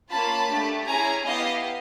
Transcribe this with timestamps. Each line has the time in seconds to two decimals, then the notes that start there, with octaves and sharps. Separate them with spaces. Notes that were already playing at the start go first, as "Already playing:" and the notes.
0.09 A#3 C#4 F4 A5 B5
0.48 A3 D4 G4
0.87 C#4 E4 G#4 G#5 A#5
1.25 B3 E4 G4 D#5 F5